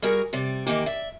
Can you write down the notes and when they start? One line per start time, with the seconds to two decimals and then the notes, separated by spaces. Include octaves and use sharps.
0.02 G3 F#4 G#4 A#4
0.33 C3 G3 D5
0.66 D#3 E3 A#3 G4
0.86 D5 E5